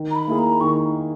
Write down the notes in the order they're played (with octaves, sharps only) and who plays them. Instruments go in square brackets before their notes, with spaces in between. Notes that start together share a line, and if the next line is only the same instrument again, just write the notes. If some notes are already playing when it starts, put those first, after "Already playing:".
Already playing: [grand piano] D#3
[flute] A#5
B5
[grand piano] A#3 E4 G#4
[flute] A#5
[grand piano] D#3 [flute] C#6